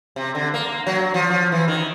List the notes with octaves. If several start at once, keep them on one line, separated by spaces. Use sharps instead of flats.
C3
D3
A#3
F#3
F3
F3
E3
D#3